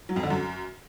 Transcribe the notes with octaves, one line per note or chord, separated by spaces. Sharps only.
F#3
F2
D3
F#2